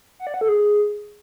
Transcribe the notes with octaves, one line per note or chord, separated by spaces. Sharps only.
F#5
D5
F#5
A4
G#4